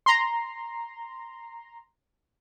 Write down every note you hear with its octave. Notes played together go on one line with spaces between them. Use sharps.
A#5 C6